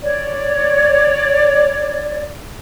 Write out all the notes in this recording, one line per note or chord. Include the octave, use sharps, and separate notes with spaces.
C#5 D5